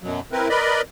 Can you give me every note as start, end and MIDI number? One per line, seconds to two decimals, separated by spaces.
0.03 0.20 42
0.03 0.20 47
0.03 0.20 54
0.32 0.48 60
0.32 0.48 64
0.32 0.48 70
0.32 0.48 71
0.50 0.82 70
0.50 0.82 71
0.50 0.82 74
0.50 0.82 75
0.50 0.82 83